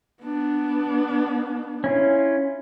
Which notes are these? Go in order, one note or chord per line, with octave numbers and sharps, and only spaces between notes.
B3 D4
C#4 E4 F4